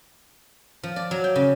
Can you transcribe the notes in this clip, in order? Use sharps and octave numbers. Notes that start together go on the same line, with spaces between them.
F3
D5
F#3
G5
C#3